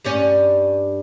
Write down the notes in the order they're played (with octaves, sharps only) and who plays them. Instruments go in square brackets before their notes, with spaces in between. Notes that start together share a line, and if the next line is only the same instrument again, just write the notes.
[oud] G2 G3 C#4